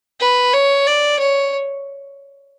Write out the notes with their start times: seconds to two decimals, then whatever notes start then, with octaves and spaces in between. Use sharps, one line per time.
0.20 B4
0.53 C#5
0.87 D5
1.19 C#5